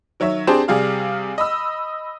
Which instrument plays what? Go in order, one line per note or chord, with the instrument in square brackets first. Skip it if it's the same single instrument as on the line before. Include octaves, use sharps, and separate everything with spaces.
[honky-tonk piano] D#3 F#3 C#5 E5
C4 D4 G4 G#4 C5 A5
C3 G3 G#4 F5 F6
D#5 B5 E6